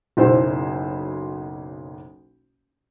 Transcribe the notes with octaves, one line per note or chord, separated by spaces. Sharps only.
F#1 B1 E4 C5